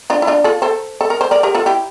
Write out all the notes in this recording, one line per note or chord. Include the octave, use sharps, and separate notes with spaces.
D4 F4
E4
D4 F4
F4 A4
A4 C5
A4
A#4
C5
A#4 D5
G4 A#4
F4 A4
E4 G4